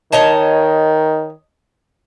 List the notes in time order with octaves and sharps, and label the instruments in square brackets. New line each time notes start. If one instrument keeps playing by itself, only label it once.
[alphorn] D#3 [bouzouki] C#5 D#5 A5